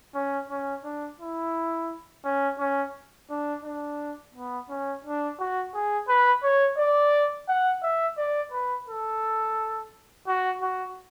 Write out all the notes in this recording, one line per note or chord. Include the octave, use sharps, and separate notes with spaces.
C#4
C#4
D4
E4
C#4
C#4
D4
D4
B3
C#4
D4
F#4
G#4
B4
C#5
D5
F#5
E5
D5
B4
A4
F#4
F#4